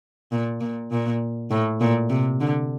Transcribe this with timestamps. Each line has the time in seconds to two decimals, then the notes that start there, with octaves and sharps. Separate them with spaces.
0.32 A#2
0.61 A#2
0.92 A#2
1.50 A2
1.81 A#2
2.09 C3
2.40 D3